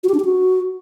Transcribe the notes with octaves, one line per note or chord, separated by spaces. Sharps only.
F#4
G4
D4
G4
F#4